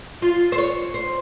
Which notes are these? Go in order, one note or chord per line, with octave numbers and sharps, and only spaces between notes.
F4
C5
C#5
C5